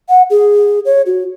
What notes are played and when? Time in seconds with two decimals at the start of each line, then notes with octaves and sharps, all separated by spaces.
0.09 F#5
0.30 G#4
0.85 C#5
1.06 F#4